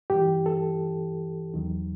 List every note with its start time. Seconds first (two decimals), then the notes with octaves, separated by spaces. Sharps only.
0.10 G2 E3 G4
0.46 A4
1.54 E2 D#3 F#3